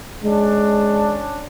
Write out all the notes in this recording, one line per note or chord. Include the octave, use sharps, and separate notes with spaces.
G#3 C#4 D4